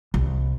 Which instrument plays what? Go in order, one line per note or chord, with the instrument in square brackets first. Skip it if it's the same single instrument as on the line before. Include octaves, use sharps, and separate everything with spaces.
[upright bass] C2